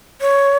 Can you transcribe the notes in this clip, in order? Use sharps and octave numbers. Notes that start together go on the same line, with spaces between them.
C#5